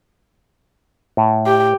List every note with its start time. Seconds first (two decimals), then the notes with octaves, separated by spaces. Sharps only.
1.17 A2
1.46 G4